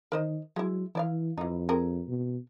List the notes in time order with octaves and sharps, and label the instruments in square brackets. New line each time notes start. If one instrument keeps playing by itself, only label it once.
[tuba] D#3 [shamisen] A#4 C5 D#5
[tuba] F#3 [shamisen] G#3 E4
[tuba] E3 [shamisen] E4 D5 F5
[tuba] F2 [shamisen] E3 D#4
[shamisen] C4 G#4 A#4
[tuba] B2